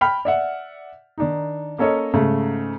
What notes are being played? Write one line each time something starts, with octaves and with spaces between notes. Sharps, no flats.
G5 B5 F6
D5 E5 F#5
D#3 D4 D#4
A#3 C#4 A4 C#5 D#5
G#2 C#3 A3